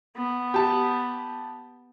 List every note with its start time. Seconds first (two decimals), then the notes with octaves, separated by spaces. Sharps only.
0.16 B3
0.54 G4 A5